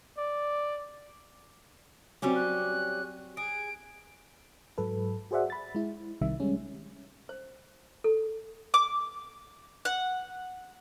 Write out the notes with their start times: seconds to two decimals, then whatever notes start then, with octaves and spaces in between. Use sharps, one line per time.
0.17 D5
2.22 F#3 G3 C4 C#4 G4
2.36 F#6
3.37 G#4 D7
4.78 G#2 F#3 A4 B4
5.31 F#4 G#4 C5 D5 E5 F#5
5.50 B5 A6
5.75 G#3 E4
6.21 B1 C3 D#3 G3 E5
6.40 G3 G#3 C#4
7.29 C5
8.04 A4
8.74 D6
9.85 F#5